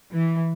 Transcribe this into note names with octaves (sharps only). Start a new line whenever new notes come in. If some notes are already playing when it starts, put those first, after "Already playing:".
E3